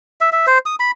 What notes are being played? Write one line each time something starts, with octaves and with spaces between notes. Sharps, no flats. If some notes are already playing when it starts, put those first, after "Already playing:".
E5
E5
C5
D#6
B5